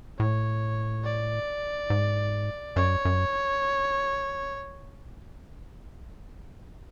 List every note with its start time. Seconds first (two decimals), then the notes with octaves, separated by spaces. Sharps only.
0.19 A2 C#5
1.04 D5
1.90 G#2
2.76 F#2 C#5
3.05 F#2